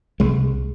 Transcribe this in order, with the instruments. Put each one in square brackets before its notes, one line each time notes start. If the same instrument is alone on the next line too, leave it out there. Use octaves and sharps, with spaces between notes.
[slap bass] C2 G#3